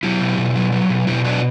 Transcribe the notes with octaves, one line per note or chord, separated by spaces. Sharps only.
F#3 E4 G4
B2
B2
F#3
F#3
B2
B2 E4 G4
F#3 D4 F#4